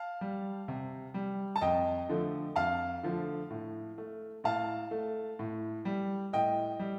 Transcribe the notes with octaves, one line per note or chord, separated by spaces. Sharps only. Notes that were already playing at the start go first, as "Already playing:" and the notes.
Already playing: F5 A5
G3
C3
G3
A5
F2 D#5 G5
D3 F3 A3
F2 F5 A5
D3 F3 A3
A2
A3
A2 F5 A5
A3
A2
G3
A2 D#5 G5
G3